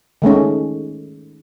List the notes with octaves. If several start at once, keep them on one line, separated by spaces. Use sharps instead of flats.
D#3 G#3 A3 C#4